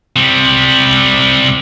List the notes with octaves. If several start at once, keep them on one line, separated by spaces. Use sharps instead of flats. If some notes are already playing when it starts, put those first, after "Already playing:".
C3 G3